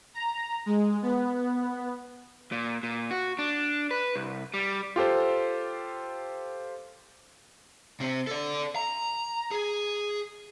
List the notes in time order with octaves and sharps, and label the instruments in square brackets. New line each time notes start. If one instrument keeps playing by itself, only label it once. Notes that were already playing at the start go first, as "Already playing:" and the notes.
[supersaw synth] A#5
G#3
B3
[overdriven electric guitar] A#2
A#2
F#4
D4
B4
C2
G3
[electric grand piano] F4 G4 A4 C5
[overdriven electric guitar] C3 C4
A4 D5
A#5
G#4